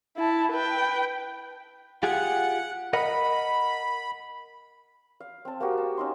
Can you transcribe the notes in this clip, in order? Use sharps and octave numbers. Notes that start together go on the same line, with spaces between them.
E4 A5
B4 G5
F4 G4 G#4 F#5
A#4 D#5 F#5 B5
F5
C4 A5
A#3 C4 F#4 G4
A5
C#4 D#4 C6